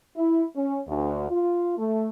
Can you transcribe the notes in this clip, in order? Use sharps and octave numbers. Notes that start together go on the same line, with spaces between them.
E4
C#4
D2
F4
A3